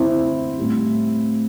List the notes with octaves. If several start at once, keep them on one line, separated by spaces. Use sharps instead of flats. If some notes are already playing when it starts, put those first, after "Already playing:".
Already playing: D3 C4 E4
A2 G3